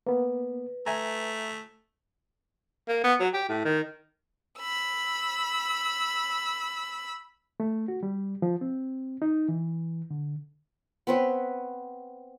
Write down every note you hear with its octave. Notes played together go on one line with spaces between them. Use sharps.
A#3 B3 B4
A3 E5 G#5 A#5
A#3
B3
F#3
G4
A2
D#3
B5 E6
A3
F#4
G3
F3
C4
D#4
E3
D3
B3 C4 B4 C#5